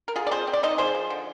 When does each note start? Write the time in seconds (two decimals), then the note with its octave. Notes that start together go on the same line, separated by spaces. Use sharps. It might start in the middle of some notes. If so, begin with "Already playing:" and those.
0.08 A#4
0.16 D3 F4 G#4
0.27 D5
0.31 C4 G#4 C5
0.47 C4
0.53 D5
0.63 D#4 C5 D#5
0.78 F3 G#4 C5
0.95 F3
1.10 D3